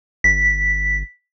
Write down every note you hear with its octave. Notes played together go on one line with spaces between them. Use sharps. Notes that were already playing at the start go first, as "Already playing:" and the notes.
G1 B6